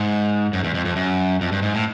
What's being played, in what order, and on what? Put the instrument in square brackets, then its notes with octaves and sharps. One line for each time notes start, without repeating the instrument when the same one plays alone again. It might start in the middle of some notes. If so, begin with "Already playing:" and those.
Already playing: [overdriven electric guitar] G#2
F#2
E2
F2
F2
F#2
F2
G2
G#2
A2